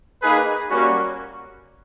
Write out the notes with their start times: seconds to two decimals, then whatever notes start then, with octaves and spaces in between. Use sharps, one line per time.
0.22 A#3 D#4 G#4 B4
0.70 G3 A#3 C#4 F#4